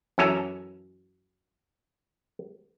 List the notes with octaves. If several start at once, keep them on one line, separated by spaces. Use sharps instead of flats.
F#2 E3 C#4 A4 G#5 A#5